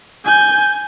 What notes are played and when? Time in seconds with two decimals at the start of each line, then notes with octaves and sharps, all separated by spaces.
0.24 G#5 G6